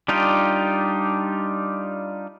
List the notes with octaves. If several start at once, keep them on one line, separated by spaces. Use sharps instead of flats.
G3 D4 D#4 F4 G4